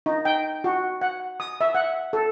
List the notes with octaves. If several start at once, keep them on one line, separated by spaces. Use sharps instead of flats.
D#4
G5
F#4
F#5
D#6
E5
F#5
A4